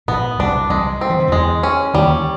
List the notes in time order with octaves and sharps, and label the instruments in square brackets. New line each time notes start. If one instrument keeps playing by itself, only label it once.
[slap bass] A#1 A#2 [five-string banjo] B3
[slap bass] C2 C3 [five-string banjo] D4
[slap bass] C2 C3 [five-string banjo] G#3
[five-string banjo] C4
[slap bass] E3
D#3
[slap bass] E2 E3 [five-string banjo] G#3
[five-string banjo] C#4
[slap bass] D#2 D#3 [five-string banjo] G3